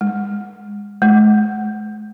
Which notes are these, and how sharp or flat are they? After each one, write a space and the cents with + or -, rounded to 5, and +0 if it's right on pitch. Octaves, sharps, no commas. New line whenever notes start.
G#3 -25
G#3 +40